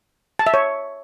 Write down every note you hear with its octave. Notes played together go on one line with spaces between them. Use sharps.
A5
E5
C#5